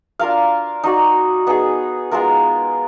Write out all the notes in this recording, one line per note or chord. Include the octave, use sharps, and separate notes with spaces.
D4 F4 A#4 F5
D#4 F#4 D5
B3 D#4 G#4
G#3 B3 F4 A#4